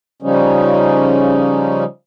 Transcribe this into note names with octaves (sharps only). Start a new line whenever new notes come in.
C#3 F3 G3 C#4 D#4